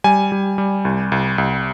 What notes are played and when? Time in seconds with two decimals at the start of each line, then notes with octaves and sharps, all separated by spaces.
0.04 G3 G#5
0.32 G3
0.58 G3
0.85 C2
1.12 C2
1.38 C2